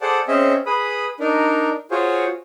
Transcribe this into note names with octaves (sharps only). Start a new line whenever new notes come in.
G#4 A4 C5 D5 F#5 A5
C4 C#4 G#4 D#5 E5
G#4 B4 B5 D#6
D4 D#4 A#4
F4 F#4 G#4 C5 C#5